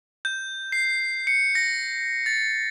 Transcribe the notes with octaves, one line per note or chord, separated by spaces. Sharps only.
G6
C7
C#7
A#6
A6